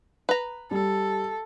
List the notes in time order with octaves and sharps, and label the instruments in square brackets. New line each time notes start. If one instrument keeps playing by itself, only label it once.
[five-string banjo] B4 A#5
[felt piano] G3 [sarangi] A4